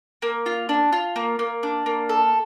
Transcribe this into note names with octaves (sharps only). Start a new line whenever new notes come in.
A#3
F4
D4
F4
A#3
A#3
D4
A#3
A4